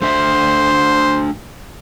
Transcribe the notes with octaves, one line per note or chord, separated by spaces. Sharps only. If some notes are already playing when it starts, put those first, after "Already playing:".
A3 D4 C5 E5